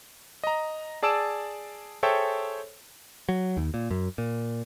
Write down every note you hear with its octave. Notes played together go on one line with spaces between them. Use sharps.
D#5 A#5
G#4 D5 A5 E6 D7 E7
G#4 A4 C5 C#5 E5 G5
F#3
D#2
A#2
F#2
A#2